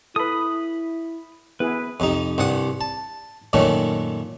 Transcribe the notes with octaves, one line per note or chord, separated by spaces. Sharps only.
E4 A4 B4 B5 D#6
B3 E4 G#4 B4
F2 C3 D#4
C2 G2 C3 F#5 D#6
A5
F#2 A#2 D#3 A3 C#4